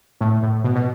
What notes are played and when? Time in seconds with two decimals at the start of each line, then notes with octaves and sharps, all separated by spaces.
0.21 A2
0.42 A2
0.64 B2
0.75 B2